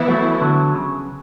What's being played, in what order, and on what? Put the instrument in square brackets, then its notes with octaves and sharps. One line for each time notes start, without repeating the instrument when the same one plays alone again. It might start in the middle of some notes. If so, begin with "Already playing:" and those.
Already playing: [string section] E3 B3 E4
[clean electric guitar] F#3 A3
D3 F#3
C#3